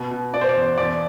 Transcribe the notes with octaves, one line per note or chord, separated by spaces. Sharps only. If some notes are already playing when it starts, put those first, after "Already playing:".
Already playing: B2
B2
B2 D5
C5
D5
E2
E2 D5